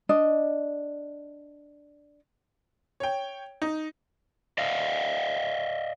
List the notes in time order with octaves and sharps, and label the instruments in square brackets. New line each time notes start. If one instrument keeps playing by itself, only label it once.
[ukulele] D4 D#5
[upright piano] C#5 G5
D#4
[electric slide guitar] D5 D#5 F5